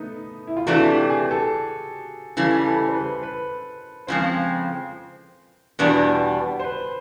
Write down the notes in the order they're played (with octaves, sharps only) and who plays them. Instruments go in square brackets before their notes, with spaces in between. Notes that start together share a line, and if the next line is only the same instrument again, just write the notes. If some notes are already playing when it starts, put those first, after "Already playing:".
Already playing: [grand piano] A3 B3 D#4
E4
F4
[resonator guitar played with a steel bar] C3 E3 A3 D4 [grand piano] F#4
[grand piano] G4
G#4
A4
[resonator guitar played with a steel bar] C#3 E3 G3 [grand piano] A4
[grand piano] A4
C5
B4
B4
[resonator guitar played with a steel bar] F2 C#3 F3 G#3 C4 [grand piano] C5
[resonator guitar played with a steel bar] E2 B2 G3 B3 D4
[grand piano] C5
B4